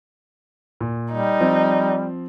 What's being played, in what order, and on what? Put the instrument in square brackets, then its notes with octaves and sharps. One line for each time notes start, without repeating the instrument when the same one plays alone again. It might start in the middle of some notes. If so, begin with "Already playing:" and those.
[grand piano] A#2
[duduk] G3 [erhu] D#4
[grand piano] F3 C4